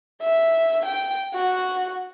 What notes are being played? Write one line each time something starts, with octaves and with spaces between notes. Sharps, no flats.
E5
G5
F#4